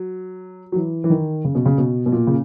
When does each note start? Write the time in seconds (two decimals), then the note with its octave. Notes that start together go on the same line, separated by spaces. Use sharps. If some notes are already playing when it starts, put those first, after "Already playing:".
Already playing: F#3
0.72 F#3
0.76 E3
1.04 E3
1.10 D#3
1.44 C#3
1.55 B2
1.66 C#3
1.78 B2
2.06 B2
2.12 A#2
2.27 C#3